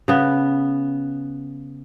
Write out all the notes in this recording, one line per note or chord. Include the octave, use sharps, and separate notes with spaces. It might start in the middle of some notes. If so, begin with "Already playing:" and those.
C#3 B3